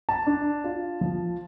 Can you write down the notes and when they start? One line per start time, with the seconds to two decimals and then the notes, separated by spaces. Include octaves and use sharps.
0.09 A5
0.26 D4
0.64 F4
1.01 F3